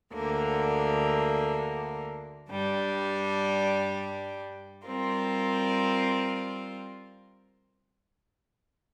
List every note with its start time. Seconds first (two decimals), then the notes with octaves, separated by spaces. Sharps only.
0.14 D2 D3 A#3
2.50 G2 G3 D4
4.87 G3 C4 F4 A#4